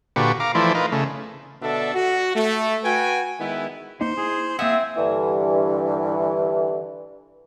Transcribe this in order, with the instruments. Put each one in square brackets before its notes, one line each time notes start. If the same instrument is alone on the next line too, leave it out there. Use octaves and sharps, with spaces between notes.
[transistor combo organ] A#2 D3 F#4 G4 B4 C#6
F5 A#5 D6
E3 F3 A3 E4 C5 D5
D#4 F4 A#4 B4
C#3 A3
[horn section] B2 D3 D4 A4 E5
F#4
A3
F#4 B4 G5 G#5
D#3 G#3 B3 E4
[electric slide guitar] A#3 D#4 D#5 [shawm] C5
[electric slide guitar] E4 [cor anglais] G#4
[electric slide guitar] A#3 F5 F#5 [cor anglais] C4 [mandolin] E4 [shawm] G#4
[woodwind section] G2 D3 E3